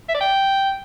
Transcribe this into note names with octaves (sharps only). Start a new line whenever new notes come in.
E5
D5
G5